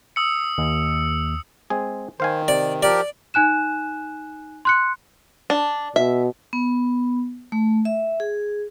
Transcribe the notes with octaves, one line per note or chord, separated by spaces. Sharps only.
D#6 E6 C#7
D#2
G#3 C4 G#4
D#3 C5 F5 G#5
C3 D5
F3 G4 A#4 D5
D#4 G#5 F#6 E7
C6 F#6 C#7
D4
B2 E5
B3
A3
E5
G#4